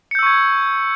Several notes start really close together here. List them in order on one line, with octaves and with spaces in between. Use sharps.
C#7 G6 E6 C#6 G#6